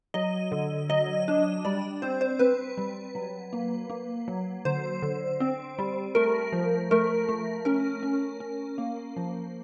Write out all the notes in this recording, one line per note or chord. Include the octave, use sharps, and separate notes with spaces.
F#3 D#5
D3
F#3 D#5
D4
G3 D5
C4 C5
C5
C4 B4
G3
F#3
A#3
A#3
F#3
D3 C5
D3
C4
G3
A3 A#4
F3
A3 A#4
A3
C#4 A#4
C#4
C#4
A#3
F3